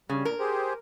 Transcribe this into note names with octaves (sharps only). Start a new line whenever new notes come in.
C#3 G3
A#2 A#4
G4 G#4 C5